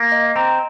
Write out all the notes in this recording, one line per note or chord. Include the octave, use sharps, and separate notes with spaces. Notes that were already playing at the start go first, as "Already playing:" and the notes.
Already playing: A#3
D#5
C4 A#5